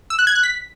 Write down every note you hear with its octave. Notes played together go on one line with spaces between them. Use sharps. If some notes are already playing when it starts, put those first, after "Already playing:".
E6
F#6
G#6
F#6
B6